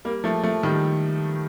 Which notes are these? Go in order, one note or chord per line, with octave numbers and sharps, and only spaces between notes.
G3 A#3
F3 A3
F3 A3
D#3 G3